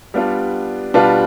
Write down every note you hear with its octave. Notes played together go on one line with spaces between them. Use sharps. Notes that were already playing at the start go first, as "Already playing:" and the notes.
G3 B3 D4 F4
B2 G3 D4 F4 B4